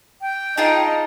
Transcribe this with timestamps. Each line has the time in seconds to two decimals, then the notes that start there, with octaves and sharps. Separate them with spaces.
0.22 G5
0.57 D#4 F4 G#4 A5